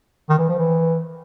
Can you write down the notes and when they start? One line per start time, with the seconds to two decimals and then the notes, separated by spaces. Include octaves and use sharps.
0.30 D#3
0.39 E3
0.49 F3
0.58 E3